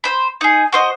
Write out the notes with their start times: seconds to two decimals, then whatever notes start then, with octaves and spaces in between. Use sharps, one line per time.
0.04 C5 B5
0.41 D#4 G#4
0.73 F#4 C5 D#5